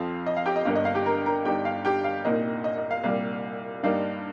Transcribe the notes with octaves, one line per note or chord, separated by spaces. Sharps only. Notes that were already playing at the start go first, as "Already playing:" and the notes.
Already playing: F2 F3 C4 F5
D#5
F5
G4 G5
D#5
G1 G2 G3 A#3 F5
D#5
F5
G4 G5
A#4 A#5
A#4 A#5
G1 G2 G3 D#4 G4 G5
F5
G4 G5
F5
C2 A#2 A#3 D#4 D#5
D#5
D#5
F5
C2 A#2 G3 F5
G2 G3 A#3 D#4 F5